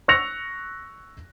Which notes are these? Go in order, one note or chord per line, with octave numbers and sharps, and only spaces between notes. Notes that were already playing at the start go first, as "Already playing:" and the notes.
C#6 E6 F#6 A#6 C#7 F7